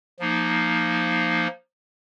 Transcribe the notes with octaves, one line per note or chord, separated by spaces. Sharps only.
F3 A#3 D#4